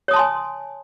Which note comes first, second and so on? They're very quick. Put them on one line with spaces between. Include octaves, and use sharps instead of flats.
C#5 D#6 A5 C6 G#5